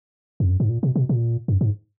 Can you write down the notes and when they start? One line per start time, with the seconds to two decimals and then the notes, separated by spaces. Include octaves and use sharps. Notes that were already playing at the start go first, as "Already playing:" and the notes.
0.40 F2
0.50 F#2
0.60 G#2
0.69 A#2
0.83 B2
0.96 B2
1.09 A#2
1.48 F#2
1.61 G#2